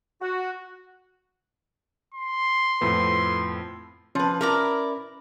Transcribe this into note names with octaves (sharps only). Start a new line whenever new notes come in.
F#4
C6
F2 A2 B3
F3 C#4 B4
E4 A#4 D5 A#5